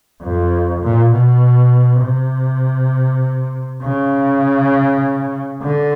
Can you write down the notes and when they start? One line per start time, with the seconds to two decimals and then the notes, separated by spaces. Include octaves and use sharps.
0.22 F2
0.82 A#2
1.12 B2
2.01 C3
3.82 C#3
5.62 D3